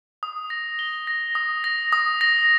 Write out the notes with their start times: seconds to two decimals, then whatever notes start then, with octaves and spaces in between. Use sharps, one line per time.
0.23 D#6
0.50 A#6
0.79 G7
1.07 A#6
1.35 D#6
1.64 A#6
1.93 D#6
2.21 A#6